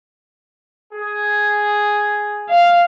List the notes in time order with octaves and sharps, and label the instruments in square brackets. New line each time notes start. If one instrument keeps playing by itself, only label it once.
[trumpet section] G#4
[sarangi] F5